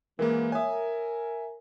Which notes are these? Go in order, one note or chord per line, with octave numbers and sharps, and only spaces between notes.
F#2 E3 F3 G#3 A#3 B3 A#4 F5
A#4 C#5 E5 G#5 D#6